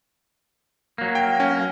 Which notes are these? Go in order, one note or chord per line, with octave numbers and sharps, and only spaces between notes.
F#3 A#3
G5
C#4